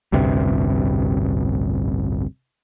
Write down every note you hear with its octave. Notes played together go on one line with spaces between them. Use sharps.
A1 D2 G2 C3